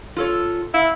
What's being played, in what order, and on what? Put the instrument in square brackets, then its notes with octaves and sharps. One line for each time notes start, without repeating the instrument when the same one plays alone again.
[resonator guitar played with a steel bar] F4 A4 C#5
[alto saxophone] E4 [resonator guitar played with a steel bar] F5